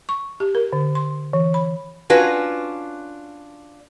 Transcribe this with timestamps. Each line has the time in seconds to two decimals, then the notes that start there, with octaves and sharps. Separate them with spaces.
0.09 C#6
0.40 G4
0.55 A#4
0.73 D3
0.95 C6
1.33 E3
1.54 B5
2.10 C#4 D4 F4 F#4 B4